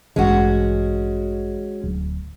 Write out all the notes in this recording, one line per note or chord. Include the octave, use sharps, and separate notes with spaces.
A1 G2 E3 G#3 C#4 F#4
D1